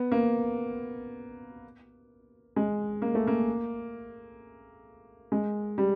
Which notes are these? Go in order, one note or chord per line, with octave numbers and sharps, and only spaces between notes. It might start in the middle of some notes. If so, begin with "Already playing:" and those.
Already playing: B3
A#3
G#3
A#3
A3
A#3
G#3
G3